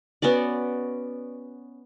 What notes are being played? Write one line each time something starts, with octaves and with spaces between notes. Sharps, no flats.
B3 C#4 F#4 D5